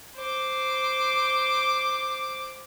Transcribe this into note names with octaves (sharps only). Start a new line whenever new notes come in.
C5 D6